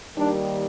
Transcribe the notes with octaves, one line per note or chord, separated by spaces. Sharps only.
D#2 D#3 G3 D4